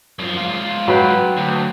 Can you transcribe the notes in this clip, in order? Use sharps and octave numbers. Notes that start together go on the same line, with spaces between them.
F#2 F3
G#2 F4
F#3 B4 G5
D2